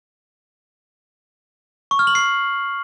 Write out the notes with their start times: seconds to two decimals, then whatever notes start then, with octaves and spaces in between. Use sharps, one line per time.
1.91 C#6
1.99 F6
2.07 F#7
2.15 C7